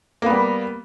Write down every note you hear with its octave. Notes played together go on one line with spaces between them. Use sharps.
G3 A#3 B3